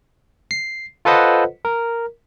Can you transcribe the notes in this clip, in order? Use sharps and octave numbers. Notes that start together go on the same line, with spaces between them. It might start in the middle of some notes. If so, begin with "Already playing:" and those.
C7
F4 A4 B4 C5 D#5 F#5
A#4